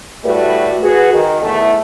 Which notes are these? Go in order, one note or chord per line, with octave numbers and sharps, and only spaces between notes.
A2 G3 A3 F#4 B4 D5
F#4 G#4 B4
D#3
E2 A3